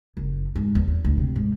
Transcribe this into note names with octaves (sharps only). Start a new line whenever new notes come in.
F#1
G#2
E2
E2
D2
C3
G#2